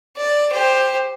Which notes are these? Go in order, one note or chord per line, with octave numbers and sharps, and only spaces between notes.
D5
G4 C5